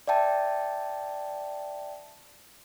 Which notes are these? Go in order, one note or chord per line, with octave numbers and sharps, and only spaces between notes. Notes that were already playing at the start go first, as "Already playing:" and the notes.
D5 E5 G5 A5